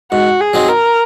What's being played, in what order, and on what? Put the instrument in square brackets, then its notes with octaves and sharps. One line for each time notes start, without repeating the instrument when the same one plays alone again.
[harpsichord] G#2 [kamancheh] F#4
[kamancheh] G#4
[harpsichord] F#3 C4 D#4
[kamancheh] A#4